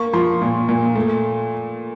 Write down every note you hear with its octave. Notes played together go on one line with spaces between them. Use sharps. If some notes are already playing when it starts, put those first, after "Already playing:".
Already playing: A#3 C#6
F3 C6
A#2
A#2
A3